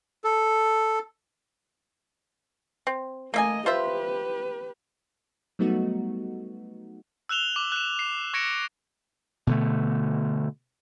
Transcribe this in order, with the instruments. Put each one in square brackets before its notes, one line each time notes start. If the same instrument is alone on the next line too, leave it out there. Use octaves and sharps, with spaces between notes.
[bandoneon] A4
[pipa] C4
[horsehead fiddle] A3 D#5 [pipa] A#3 E5 G#5
[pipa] F4 C5 E5 [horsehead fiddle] G4 B4
[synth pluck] F#3 G3 A3 B3 D#4 F#4
[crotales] E6 F#6 E7 F7 G7
D6
F#6 E7
C7
C#6 G#6 A#6 C#7 D7 E7
[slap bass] B2 D3 A3